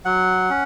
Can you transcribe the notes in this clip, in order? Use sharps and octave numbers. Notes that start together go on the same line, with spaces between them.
F#3 F#5
C#4